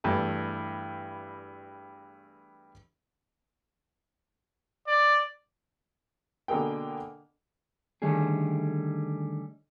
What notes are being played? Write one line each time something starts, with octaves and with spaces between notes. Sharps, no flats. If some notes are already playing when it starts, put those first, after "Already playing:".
E2 G2 E3 A3 E4 A5
D5
B2 D3 A#3 G#4 A#4 G5
D3 D#3 G3 A3 C#4 G#4